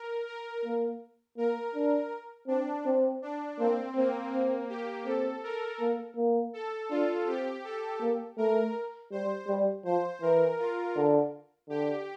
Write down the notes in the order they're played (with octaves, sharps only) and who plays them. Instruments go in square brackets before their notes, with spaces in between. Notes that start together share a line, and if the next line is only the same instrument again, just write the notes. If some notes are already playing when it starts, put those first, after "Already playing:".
Already playing: [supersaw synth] A#4
A#4
[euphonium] A#3
[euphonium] A#3 [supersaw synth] A#4
[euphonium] D4
[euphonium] C4 [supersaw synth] D4
[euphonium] C4
[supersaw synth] D4
[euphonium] A#3 [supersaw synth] C4
[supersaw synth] A#3 [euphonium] C4
[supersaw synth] A#3 [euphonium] C4
[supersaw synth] G4
[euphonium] C4 [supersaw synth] A4
[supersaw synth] A#4
[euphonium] A#3
A#3
[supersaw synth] A4
[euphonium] D4 [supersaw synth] F4
[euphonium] C4 [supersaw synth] G4
[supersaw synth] A4
[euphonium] A#3
[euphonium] A3 [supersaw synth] A#4
[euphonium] G3 [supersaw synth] C5
[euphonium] G3
[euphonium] F3 [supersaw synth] C5
[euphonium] E3 [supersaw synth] A#4
[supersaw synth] F4
[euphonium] D3
[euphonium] D3 [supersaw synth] G4